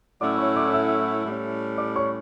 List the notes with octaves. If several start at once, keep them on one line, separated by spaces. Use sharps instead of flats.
A2 F#3 A3 C#4 E4 D5 D6
C#5 C#6
D5 D6
E5 E6
A2 G3 C#4
D5 D6
C#5 C#6